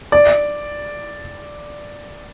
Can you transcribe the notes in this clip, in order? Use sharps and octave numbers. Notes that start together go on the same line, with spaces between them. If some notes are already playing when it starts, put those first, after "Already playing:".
D5